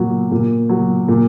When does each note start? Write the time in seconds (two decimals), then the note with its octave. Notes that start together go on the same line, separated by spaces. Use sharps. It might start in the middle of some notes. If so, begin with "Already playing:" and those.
Already playing: A#2 F#3
0.32 A#2
0.69 F#3
1.08 A#2